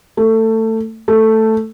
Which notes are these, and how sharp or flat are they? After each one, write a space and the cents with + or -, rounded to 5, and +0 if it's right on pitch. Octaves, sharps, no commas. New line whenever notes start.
A3 +20
A3 +5